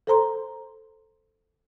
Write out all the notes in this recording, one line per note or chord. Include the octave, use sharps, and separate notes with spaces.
A4 C5 A#5 C6